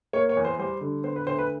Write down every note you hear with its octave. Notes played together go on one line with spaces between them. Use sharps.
A#3 C#5
C#5
E2
C5
G3 C5
D3
B3 C5
B4
D2 C5
B4